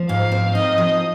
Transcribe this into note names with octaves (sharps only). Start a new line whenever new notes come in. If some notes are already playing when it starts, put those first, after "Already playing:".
Already playing: F3
G#2 F5
C4
D#4 D#5
F3